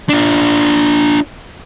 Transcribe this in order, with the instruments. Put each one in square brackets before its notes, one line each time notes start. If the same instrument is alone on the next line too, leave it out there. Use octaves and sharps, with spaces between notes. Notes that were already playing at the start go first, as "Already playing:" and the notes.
[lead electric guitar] D4 F4